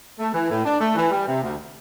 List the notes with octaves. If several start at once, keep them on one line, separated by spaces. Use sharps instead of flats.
A3
E3
A2
D4
A3
E3
G3
C3
D2